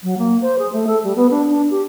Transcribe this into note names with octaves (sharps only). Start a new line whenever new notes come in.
F#3
A#3
C5
G#4
A3
A4
G3
B3
D4
D4
G4